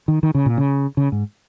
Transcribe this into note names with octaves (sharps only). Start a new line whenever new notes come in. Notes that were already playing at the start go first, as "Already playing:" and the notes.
D#3
D#3
C#3
A#2
C#3
C#3
G#2